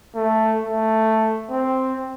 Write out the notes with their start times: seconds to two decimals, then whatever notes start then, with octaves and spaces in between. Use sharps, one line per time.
0.15 A3
0.65 A3
1.50 C4